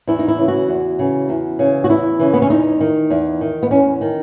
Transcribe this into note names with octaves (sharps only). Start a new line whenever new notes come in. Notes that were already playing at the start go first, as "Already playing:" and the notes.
E2 E4
D#4
E4
C#3 E3
F#4
E2
C#3 E3
E2
C#3 E3
F#4
E2 E4
C#3 E3
B3
C#4
E2 D#4
D#3
E2
D#3
B3
E2 C#4
D#3